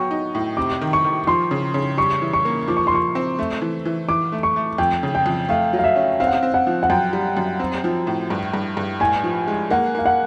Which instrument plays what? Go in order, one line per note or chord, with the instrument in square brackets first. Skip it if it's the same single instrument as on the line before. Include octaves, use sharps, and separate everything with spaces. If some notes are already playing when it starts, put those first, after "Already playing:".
Already playing: [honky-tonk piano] F#3 B3 [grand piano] G5 C#6
[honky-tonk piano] D#4
A2
[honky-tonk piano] C3 [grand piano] D6
[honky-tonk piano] D#3
[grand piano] C#6
[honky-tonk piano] D#3
[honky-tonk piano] F3 [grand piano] C6
[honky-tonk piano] C#3
C#3
[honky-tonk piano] G3 [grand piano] C#6
[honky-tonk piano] E3
[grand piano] C#6
[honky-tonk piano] A#3
[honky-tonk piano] F3 [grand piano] D6
[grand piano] C#6
C6
[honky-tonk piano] F3 [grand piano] C#6
[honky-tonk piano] C4
A3
E3
E3
[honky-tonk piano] E3 [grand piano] D6
[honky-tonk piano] A3
[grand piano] C#6
[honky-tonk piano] A3
[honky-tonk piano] F2 [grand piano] G5
[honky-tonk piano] C#3
[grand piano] G5
[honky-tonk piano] F2
[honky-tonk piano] A3 [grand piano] F5
[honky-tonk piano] F#3
[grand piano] F5
E5
[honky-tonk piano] C#4
[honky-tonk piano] C4 [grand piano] F5
[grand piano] F#5
F5
[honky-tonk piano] C4
[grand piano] F#5
[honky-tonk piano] F3
[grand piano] F#5
[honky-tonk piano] F#2 [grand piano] G5
[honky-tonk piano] G3
F#2
C4
F3
A2
G2
G2
G2
[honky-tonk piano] A2 [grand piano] G#5
[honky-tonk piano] F3
G#3
[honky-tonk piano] A#3 [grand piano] F#5
[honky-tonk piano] A#3 [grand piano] F5
[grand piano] F#5